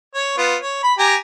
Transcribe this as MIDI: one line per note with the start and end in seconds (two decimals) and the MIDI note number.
0.14 0.33 73
0.37 0.56 59
0.37 0.56 65
0.61 0.80 73
0.83 0.94 83
0.99 1.15 67
0.99 1.15 80
0.99 1.15 82